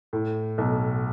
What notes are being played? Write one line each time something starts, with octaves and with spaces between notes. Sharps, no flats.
A2
B1